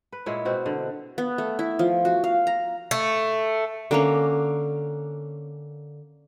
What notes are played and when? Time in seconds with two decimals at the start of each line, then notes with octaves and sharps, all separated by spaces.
0.12 B4
0.26 A#2 G#3 E4 C#5
0.45 B2 C4 F#4
0.66 D3
1.18 B3
1.38 A3
1.59 E4
1.79 F3
2.05 F#4
2.24 F5
2.47 A#5
2.91 A3
3.91 D3 A#3 C#4